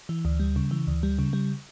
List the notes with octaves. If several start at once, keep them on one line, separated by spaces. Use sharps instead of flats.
E3
D2
G3
C#3
E3
D2
G3
C#3
G3